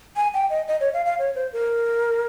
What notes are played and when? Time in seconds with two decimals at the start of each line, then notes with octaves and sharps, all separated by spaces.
0.16 G#5
0.34 G5
0.50 D#5
0.68 D#5
0.80 C#5
0.94 F5
1.06 F5
1.19 C#5
1.35 C5
1.53 A#4